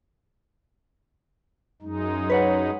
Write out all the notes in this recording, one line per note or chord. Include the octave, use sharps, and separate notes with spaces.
F#2 G#3 D#4
B4 C#5 F#5